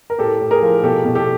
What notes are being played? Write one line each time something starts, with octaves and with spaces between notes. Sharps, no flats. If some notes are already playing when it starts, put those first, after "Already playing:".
A#4
A2 G4 A4
A2
G#4 A#4
F3
B2 G4 A4
B2
G4 A4